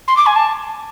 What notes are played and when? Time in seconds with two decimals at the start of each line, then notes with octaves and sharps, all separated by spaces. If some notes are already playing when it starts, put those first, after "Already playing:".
0.08 C6
0.17 D6
0.26 G#5
0.36 A5